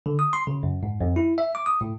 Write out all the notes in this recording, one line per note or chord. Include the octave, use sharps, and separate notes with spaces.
D3
D#6
C6
C#3
F#2
G#2
F2
E4
E5
D6
D#6
A2